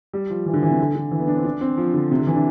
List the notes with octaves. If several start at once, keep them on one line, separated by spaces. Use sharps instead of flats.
G3
F3
E3
D3
E3
C3
D3
D3
E3
B3
D4
C4
D4
C4
F3
D3
C3
D3
E3
D4